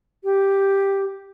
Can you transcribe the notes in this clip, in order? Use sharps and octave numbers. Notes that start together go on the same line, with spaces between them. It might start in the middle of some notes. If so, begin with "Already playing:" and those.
G4